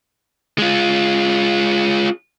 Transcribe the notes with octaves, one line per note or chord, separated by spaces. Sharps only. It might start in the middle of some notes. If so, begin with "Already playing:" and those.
G#3 F4